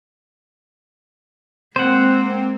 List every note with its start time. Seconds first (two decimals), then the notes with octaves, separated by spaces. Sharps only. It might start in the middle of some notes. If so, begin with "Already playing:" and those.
1.76 G#3 A#3 C4 C5 F#5